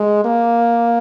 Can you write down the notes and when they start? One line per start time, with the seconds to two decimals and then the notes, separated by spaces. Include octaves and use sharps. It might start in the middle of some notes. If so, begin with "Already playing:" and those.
Already playing: G#3
0.25 A#3